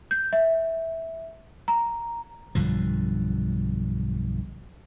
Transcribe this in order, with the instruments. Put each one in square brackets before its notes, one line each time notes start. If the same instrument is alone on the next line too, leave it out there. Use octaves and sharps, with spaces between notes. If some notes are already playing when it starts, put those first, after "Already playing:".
[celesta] G6
E5
A#5
[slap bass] B1 G2 D3 F3